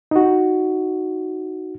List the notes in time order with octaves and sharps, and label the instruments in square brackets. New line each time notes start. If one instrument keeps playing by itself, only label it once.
[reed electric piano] D#4 F#4